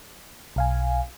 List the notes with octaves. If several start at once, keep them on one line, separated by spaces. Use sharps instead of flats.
B1 F5 G#5